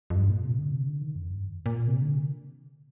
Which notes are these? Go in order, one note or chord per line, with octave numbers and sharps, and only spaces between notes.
F2
G2
A#2
C3
D3
C3
D3
D#3
F2
G2
A#2
C3
D3